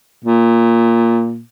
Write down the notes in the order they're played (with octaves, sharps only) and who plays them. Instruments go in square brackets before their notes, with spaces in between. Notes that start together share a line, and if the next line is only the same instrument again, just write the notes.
[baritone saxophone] A#2